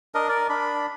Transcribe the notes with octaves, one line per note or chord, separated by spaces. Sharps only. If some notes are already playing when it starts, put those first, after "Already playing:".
D4 A#4 D#5
A#4 D5
D4 B5